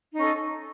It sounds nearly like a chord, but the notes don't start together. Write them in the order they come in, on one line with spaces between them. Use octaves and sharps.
D#4 D#5 C#4 A4